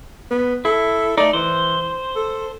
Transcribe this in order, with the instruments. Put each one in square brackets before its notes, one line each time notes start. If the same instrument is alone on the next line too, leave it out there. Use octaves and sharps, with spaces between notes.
[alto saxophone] B3
[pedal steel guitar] E4 [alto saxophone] A4
[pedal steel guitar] A3 D#4 [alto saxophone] D5
[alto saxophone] E3 [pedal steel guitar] C5
[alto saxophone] A4